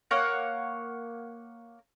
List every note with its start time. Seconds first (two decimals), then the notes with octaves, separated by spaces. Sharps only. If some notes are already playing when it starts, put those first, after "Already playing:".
0.11 A#3 C#5 F#5